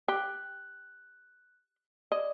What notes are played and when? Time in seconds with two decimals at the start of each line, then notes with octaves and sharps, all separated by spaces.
0.08 G4 F#6
2.12 D5 D#5